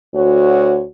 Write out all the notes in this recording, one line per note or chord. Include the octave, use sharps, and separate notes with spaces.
D2 F#4 C#5